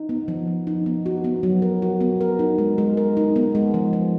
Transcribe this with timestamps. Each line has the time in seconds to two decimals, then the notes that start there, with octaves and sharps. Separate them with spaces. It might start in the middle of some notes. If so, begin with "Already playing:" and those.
Already playing: D#4
0.09 B3
0.28 F3
0.47 F3
0.67 D#4
0.86 B3
1.06 F#4
1.24 B3
1.43 F#3
1.62 A#4
1.82 F#4
2.01 B3
2.21 A#4
2.39 D#4
2.58 G#3
2.78 G#3
2.97 A#4
3.17 D#4
3.36 B3
3.55 G#3
3.74 F3
3.93 F3